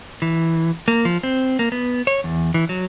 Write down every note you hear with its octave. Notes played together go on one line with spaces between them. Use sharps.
E3
A#3
F3
C4
A#3
B3
C#5
E2
E3
F#3